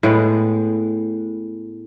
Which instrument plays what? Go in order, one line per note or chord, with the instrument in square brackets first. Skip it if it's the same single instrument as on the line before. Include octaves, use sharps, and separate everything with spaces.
[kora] A2 G#3 B3